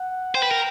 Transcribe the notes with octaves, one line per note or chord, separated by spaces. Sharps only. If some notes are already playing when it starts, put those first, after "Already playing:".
Already playing: F#5
C5 G5
B4
A#4